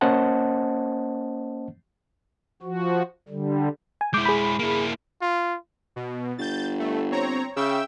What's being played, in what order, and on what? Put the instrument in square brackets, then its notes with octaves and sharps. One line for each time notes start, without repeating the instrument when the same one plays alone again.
[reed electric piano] A#3 C#4 C5 D#5 F#5 A5
[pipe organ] F3 F#4
D3 G3
[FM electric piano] G#5
[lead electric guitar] G#3 E4 [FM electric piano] D6 G6
[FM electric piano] G#4 B5
[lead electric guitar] A#3 E4
[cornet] F4
[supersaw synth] B2
[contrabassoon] G1 [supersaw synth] G6 A6
[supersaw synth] A3
C4 C#5 A#5
[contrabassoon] C#3 [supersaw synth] E5 G5 E6